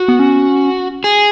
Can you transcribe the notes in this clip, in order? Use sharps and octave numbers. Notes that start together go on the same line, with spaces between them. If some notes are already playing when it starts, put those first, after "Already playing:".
Already playing: F#4
B3
C#4
G#4